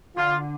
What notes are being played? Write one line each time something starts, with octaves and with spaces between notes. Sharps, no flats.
D3 F4